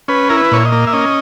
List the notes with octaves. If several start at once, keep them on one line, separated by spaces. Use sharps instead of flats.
C#4 B4
E4 A#4
B4
A#2 C#5
D#5
A#3
E5
C#4 D#5